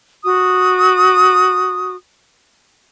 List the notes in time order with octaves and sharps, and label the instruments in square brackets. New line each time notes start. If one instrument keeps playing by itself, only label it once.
[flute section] F#4 D#6